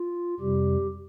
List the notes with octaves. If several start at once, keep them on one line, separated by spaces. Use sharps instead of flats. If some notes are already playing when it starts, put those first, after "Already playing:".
Already playing: F4
F2 C3 G3 G4